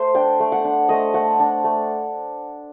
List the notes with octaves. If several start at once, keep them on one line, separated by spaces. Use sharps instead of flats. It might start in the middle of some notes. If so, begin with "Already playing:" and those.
Already playing: A3 C5
D4 G5
A3
F#5
D4
A3 D#5
A3 F#5
D4
A3